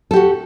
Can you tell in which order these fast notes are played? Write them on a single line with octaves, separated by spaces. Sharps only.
A4 G4 F#4